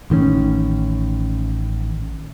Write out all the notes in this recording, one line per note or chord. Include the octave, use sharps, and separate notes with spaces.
A1 D#3 G#3 C#4